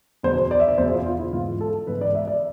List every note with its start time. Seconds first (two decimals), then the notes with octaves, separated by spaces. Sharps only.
0.23 E2 B2 B3 C5
0.51 D5
0.60 E5
0.68 D5
0.78 E2 B2 B3 C5
0.88 G#4
0.92 F4
1.06 F4
1.19 E4
1.32 G#2 E3 B3 F4
1.61 A4
1.87 G#2 E3 B3 B4
2.01 D5
2.15 E5
2.27 D5